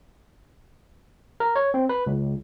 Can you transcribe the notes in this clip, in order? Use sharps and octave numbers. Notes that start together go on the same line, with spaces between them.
A#4
C#5
C4
B4
C#2